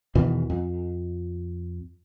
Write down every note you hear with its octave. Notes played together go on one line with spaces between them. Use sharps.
E2 B2 D#3 E3
F2